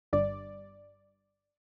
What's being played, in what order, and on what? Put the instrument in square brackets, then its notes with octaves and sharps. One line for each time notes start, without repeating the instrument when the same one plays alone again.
[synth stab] G1 G2 D5